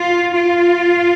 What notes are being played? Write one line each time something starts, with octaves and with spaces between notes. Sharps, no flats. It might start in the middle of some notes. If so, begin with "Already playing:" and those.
Already playing: F4
F4